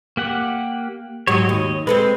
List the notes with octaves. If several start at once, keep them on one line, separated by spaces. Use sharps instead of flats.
A#3 G4 F#5
G#2 F#3 G4 C#5 D#5
D#2
G#3 C4 A4 B4